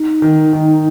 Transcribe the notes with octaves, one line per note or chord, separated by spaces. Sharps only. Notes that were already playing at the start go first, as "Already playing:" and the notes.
Already playing: D#4
D#3
D#3